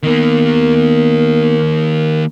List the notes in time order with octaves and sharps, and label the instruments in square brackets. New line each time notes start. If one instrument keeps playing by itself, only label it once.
[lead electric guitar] D#3 A#3 [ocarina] B3 [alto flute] A#4